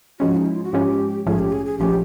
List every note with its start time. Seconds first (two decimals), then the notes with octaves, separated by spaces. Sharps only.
0.20 G#2 F3 G#3 C#4 F#4
0.36 D#4
0.46 E4
0.55 F4
0.64 F#4
0.73 G#2 F3 G#3 C#4 G4
1.26 A#1 G#2 F3 A3 C#4 G#4
1.39 G4
1.52 G#4
1.66 G#4
1.79 A#1 F3 A3 C#4 G4